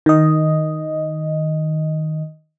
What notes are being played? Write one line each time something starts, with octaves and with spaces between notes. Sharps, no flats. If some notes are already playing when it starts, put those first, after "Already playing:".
D#3 D#5